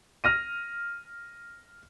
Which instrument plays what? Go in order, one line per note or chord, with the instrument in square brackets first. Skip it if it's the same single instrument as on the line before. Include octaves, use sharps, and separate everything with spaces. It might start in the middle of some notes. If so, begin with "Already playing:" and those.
[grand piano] F6 A#6 D#7